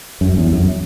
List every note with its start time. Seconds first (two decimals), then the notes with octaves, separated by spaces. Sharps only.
0.21 F#2
0.37 E2
0.53 F#2